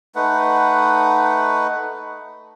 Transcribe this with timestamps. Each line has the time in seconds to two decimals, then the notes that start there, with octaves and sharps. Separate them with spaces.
0.15 A3 D#4 B4 F#5